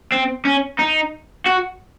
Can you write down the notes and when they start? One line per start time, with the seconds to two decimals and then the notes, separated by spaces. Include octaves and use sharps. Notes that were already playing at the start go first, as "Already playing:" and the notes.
0.12 C4
0.45 C#4
0.79 D#4
1.46 F#4